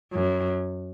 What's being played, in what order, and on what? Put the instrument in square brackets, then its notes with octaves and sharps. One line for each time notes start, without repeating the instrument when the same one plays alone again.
[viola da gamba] F#2